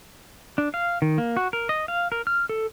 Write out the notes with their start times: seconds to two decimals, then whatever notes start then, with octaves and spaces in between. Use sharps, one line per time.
0.58 D4
0.74 F5
1.02 D#3
1.18 A#3
1.37 F#4
1.53 A#4
1.69 D#5
1.88 F5
2.12 A#4
2.27 F6
2.49 A4